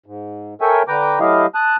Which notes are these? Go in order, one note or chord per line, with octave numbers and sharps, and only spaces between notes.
G#2
A4 A#4 C#5 E5 G5 G#5
D3 B4 G5 A#5 D6
F#3 A3 E4 G4 D#5 F5
A5 D#6 F#6